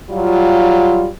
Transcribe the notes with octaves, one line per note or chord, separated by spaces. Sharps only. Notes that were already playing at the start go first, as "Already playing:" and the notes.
F#3 G3 F4